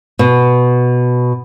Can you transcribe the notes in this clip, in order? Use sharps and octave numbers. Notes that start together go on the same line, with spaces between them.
B2